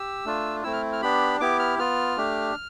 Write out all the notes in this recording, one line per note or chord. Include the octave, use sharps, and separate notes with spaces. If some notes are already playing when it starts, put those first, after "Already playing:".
Already playing: G4 E6
A3 D4 F4
A3 C4 E4 E6
F6
F6
B3 D4 G4 B5
B3 E4 G4 D6
F6
B3 F4 F6
A3 D4 G4